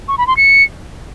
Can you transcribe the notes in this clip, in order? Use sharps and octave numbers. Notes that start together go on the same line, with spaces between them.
C#6
B5
C6
C#7